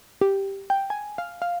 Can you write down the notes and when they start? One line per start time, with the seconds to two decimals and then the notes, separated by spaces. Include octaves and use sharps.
0.21 G4
0.70 G5
0.90 G#5
1.18 F5
1.42 F5